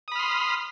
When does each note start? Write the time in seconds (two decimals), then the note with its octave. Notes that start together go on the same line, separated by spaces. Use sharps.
0.08 D#6
0.12 B5
0.16 F6
0.19 C6